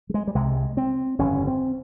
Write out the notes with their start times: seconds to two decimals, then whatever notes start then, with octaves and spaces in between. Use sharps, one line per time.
0.09 G3
0.14 G#3
0.27 G3
0.35 C2 C3 G#3
0.77 C4
1.19 G1 F2 C#3 C#4
1.47 C4